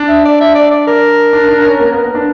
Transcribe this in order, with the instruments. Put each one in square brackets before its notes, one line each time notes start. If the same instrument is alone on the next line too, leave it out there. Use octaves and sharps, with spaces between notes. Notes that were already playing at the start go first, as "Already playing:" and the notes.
Already playing: [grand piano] D4
[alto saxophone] E5
D5
E5
D5
D5
A#4
[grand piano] D4
D4
C#4
A#3
B3
B3
D4